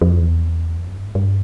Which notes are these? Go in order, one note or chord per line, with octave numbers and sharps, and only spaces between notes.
F2
E2
F2
F#2
G2
G#2
G2